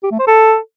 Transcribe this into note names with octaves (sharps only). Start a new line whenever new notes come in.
G4
A3
C5
A4